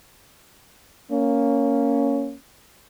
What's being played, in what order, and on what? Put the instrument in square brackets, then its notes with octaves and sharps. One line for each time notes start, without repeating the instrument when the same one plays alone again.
[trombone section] A#3 C#4